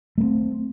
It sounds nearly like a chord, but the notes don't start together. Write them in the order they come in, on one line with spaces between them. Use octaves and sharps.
A3 A#3 C4